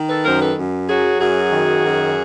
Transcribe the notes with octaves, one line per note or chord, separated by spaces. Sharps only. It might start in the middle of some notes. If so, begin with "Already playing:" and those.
Already playing: D#3
A4 B4
F#2 A#4 C5
A4 B4
F#2
F#3 F#4 G#4
F#2 F#4 G#4
D#3
F#2